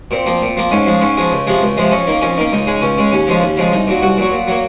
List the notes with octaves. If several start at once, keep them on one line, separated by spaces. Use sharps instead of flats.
A#2 C4
F3 A#3
A#2
F3 A#3
G#2 C#4
F3 G#3
G#2 C#4
F3 G#3
C#2
C3 F3 G#3
C#2
C3 F3 G#3
F2 C#4
D#3 A#3
F2 C#4
D#3 A#3
C#2 D#4
C#3 G#3
C#2 C#4
C#3 G#3
D#2 C#4
C#3 F3 G#3
D#2
C#3 F3 G#3
C2 D#4
A#2 F#3
C2 F#4
A#2 F#3
A#2
F#3 A#3